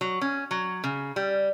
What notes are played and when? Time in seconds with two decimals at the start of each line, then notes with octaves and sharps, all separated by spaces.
0.01 F#3
0.21 C#4
0.51 F#3
0.84 C#3
1.16 G3